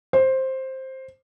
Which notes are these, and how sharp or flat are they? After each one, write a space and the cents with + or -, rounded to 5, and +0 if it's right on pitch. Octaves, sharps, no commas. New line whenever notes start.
C5 +10